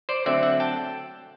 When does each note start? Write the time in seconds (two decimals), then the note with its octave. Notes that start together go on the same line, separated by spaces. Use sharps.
0.09 C5 D5
0.26 D3 F#3 A3 C4 D5 E5
0.43 E5 F#5
0.60 G5 A5